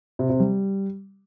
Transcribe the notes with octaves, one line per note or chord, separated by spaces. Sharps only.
C3
C3
G3